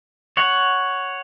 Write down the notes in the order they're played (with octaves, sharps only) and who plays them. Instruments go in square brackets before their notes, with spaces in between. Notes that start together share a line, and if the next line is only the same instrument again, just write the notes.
[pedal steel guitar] C#5 F#5